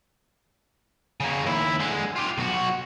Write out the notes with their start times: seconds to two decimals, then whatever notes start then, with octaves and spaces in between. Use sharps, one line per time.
1.20 C#3 A#3
1.46 D#2 E4
1.80 D3 G#3
2.16 F4 G4
2.38 B1 F#4